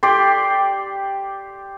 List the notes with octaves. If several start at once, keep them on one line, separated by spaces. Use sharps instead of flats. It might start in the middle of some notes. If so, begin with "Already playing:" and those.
G4 D5 C6